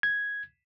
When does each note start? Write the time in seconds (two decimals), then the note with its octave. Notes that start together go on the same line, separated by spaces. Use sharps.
0.03 G#6